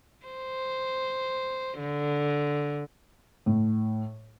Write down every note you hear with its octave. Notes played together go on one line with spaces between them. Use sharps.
C5
D3
A2